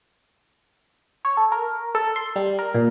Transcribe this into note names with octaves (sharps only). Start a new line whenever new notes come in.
C#5
A4
A#4
A4
C6
G3
A#4
A#2